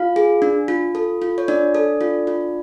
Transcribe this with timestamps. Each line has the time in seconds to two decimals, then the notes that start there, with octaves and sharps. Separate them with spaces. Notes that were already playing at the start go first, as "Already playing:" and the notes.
Already playing: F4 F5
0.16 G#4
0.42 D4
0.68 F4
0.95 A4
1.22 F4
1.38 C#5
1.48 D4 D5
1.75 A4
2.01 F4
2.27 F4